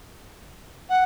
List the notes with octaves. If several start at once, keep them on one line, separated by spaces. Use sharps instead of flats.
F#5